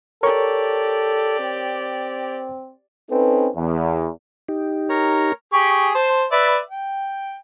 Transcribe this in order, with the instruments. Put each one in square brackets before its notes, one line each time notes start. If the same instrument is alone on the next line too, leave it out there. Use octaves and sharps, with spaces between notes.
[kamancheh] G4 D5 [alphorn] A4 [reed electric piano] A#4 C#5 C#6
[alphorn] C4
[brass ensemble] C4 C#4 D#4 A4 B4
E2
[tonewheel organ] D#4 G4
[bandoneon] A#4 C#5 A#5
[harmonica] G4 G#4 C#6
C5 A5
B4 D5 E5
G5